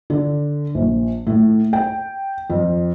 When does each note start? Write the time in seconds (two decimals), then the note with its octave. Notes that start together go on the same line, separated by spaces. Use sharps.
0.10 D3
0.75 A#1
1.27 A2
1.73 G5
2.50 F2